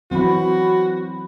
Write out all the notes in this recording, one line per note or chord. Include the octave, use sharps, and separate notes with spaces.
E3 F#3 C4 F#4 B5